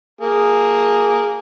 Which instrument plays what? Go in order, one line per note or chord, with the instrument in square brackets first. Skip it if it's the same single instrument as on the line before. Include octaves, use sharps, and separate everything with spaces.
[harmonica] A#3 G#4